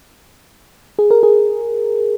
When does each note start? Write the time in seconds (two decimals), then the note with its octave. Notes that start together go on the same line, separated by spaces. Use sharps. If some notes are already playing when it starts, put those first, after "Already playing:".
0.99 G#4
1.11 A#4
1.23 G#4